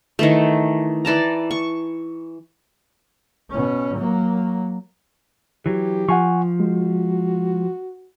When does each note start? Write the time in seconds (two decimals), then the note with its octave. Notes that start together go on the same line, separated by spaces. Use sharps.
0.19 D#3 E3 A3
1.05 E3 D5 A5 A#5
1.51 C#6
3.51 B2 C#4
3.97 F#3 A#3
5.66 E3 F#3 G4
6.09 F3 F#5 G#5 C#6
6.60 G#3 F#4